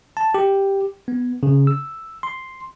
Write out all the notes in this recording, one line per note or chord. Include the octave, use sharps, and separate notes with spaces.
A5
G4
B3
C#3
E6
C6